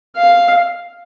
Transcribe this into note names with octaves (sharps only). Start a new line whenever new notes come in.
F5